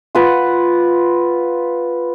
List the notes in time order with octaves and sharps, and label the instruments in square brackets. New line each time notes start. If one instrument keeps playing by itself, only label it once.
[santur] F4 B4 F#5